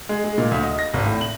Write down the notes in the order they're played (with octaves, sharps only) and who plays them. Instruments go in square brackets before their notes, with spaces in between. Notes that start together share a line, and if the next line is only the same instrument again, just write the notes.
[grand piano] G#3
G#3
A#2
D2
D#5
A#6
G#1
A2
F#7